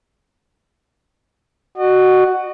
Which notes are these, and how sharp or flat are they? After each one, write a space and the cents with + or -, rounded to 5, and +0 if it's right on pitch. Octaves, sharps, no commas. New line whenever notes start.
F#4 +5 D#5 -40